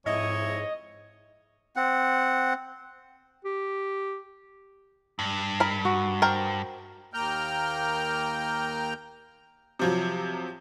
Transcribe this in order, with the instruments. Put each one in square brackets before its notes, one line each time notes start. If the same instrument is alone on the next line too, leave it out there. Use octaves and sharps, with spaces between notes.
[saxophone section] F2 E4 E5 [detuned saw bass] G#2 [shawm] C#5 [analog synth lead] D#5
[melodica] C4 F#5
[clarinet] G4
[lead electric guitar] G2
[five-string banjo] A#4 B5
[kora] F#4
[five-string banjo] A#4 C5 G5
[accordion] D#2 A#3 G5 A#5 F6 G6
[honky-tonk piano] C3 F3 F#3